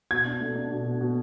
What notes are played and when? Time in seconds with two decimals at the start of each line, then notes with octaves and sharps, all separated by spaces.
0.11 B2 G#6
0.25 D4
0.40 A3
0.55 D4
0.71 B2
0.85 B2
1.01 B2